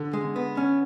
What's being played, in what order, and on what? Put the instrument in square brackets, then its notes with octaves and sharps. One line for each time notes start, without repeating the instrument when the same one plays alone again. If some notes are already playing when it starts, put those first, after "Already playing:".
Already playing: [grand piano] D3
[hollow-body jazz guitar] G#3
[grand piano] D3
[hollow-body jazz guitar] B3
C#4